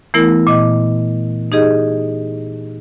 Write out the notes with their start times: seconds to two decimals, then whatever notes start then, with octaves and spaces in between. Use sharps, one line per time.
0.14 E3 A3 B3 E4 A#4
0.47 A#2 D#5
1.52 D#4 G4 G#4 D#5